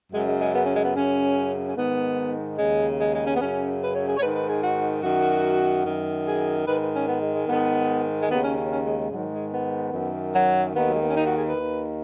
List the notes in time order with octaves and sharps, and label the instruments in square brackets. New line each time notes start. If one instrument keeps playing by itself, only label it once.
[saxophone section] F#2 C#3 G#3
G#3
G#3
B3
C#4
G#3
B3
F#2 C#3 C#4
C#4
G#2 D#3 B3
D#2 C#3 G#3
G#3
G#3
C#4
B3
F#2 C#3 C#4
B4
C#5
G#4
C#5
G#2 B4
D#3
B4
G#4
F#4
F#2 D#3 F#4
F#2 D#3
G#4
G#2 D#3 B4
B4
C#4
B3
G#3
G#3
G#2 D#3 B3
G#3
D#2 C#3 B3
C#4
C#4
C#4
G#3
G#3
G#2 D#3 F#3
G#3
B3
F#2 D#3
F#3
D#2 D#3 B3
F#3
G#3
B3
C#4
D#4
F#4
G#4
B4
D#2 D#3